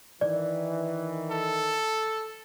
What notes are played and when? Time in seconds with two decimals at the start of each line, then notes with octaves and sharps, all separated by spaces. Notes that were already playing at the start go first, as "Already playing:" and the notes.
0.21 D#3 E3 D5
1.31 A4